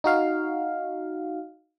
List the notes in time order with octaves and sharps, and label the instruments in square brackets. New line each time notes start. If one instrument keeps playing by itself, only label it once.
[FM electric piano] D#4 F#4 F5